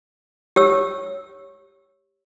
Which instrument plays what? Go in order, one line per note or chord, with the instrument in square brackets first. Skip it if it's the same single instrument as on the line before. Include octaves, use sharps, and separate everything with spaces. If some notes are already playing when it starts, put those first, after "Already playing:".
[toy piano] G4 C#5 E6